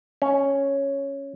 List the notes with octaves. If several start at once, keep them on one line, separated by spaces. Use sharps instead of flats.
C#4